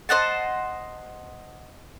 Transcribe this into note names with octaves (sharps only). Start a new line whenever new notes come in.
C5 D#5 F#5 A5